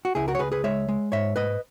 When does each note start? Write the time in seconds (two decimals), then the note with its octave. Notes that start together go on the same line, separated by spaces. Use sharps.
0.05 F#4
0.15 C#2 E4 G#4
0.28 F#4 A#4
0.35 C#5
0.39 C#2 G#4 B4
0.52 G#4 B4
0.64 G#3 C#5 E5
0.89 G#3
1.12 G#2 C#5 E5
1.36 G#2 B4 D#5